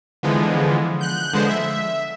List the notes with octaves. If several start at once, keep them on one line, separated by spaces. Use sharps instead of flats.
D3 E3 F3 G#3 B3
F#6 G6
D3 F3 G#3 B3 G#4 C5
E5